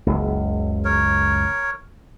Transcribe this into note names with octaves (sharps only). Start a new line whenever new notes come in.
F#1 C#2
A#4 C#5